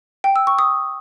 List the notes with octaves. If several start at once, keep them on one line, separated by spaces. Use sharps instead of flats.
G5
E6
C#6
D#6